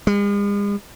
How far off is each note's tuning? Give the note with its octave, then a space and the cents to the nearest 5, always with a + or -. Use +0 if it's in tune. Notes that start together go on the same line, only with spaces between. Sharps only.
G#3 -45